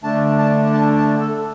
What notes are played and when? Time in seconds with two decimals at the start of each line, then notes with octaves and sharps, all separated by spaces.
0.04 D3 A3 D4 A5
0.39 A5
0.73 A5
0.97 A5
1.20 A4